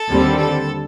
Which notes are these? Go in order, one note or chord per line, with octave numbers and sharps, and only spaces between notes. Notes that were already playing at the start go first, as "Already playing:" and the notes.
Already playing: A4
D#2 D3 G3 C4
A4